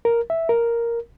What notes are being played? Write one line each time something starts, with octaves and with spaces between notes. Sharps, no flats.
A#4
E5
A#4